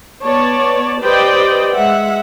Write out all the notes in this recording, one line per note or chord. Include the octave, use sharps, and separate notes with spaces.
B3 C#5 D5 A5
G4 B4 C5 D5 D#5 G5
G#3 E5 F#5